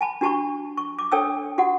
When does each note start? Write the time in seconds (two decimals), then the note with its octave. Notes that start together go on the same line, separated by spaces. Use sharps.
0.01 G#5 A5 B5
0.21 D4 F#4 G4 A5 B5 C#6
0.77 C#6
0.99 D6
1.12 D4 A4 C#5 G5 A5 E6
1.58 F#4 G4 F#5